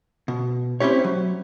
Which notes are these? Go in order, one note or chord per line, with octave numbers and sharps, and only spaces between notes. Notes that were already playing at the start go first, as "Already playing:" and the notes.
B2
C4 C#4 E4 G4 C#5
F#3